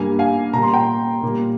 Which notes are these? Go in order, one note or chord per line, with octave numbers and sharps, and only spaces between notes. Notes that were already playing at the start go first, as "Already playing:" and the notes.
Already playing: G2 G3 A#3 G#5
F5 G#5
A#2 G3 A#3 A#5
C6
G5 A#5
A#2 G3 A#3